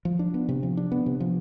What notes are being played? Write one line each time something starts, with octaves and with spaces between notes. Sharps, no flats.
F3
D4
B3
C3
F3
D4
B3
C3
F3